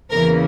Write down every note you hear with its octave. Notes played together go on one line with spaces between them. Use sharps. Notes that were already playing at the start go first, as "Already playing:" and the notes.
E2 C#3 E3 A#3 A#4